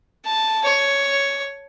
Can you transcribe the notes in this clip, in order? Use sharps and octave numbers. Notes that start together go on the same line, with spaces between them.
A5
C#5